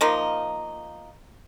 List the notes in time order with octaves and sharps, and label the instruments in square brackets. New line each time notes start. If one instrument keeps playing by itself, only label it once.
[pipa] F3 A#3 D#4